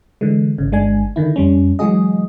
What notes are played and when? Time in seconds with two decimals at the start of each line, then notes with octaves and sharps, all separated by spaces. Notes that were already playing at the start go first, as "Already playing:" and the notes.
0.21 D3 E3 G#3
0.58 G#1 C#3
0.72 G1 G#3 D4 G#5
1.16 D3 D#3 E4
1.36 F2 G3 C#4
1.79 E3 F#3 G#3 F#4 G#4 D#5